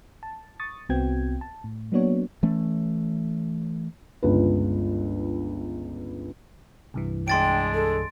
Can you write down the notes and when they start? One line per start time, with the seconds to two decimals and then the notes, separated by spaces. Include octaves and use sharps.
0.23 A5
0.60 C#6 D#6 A6
0.89 C2 B3 C4 F#4 G5 G#6
1.41 A5
1.64 A2
1.92 F#3 A#3 B3 D4 F#4 C#5
2.43 E3 A3 C#4
4.23 G1 C#2 B4
6.94 C2 G2 E3
7.28 G#3 D4 G5 C6 A6 D7
7.74 A4